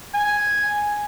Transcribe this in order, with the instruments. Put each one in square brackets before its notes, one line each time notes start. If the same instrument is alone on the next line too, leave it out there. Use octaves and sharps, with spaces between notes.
[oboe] G#5